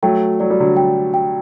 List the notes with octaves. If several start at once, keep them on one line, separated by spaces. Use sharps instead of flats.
F#3 A3 G5
F#3 D5
G3
D3 F#3
G5
G5